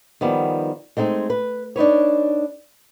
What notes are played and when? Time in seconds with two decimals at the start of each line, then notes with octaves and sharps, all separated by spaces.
0.21 D#3 F3 G3 B3
0.97 G#3 A3 C4 D#4
1.30 B4
1.76 D4 D#4 B4 C#5